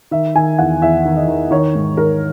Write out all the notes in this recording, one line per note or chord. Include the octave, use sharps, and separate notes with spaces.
D#3 E5
D#3 G#5
E2 F#5
E2 E5
D#3
D#5
D#3
D#3 C#5
G#2
D#3 A#4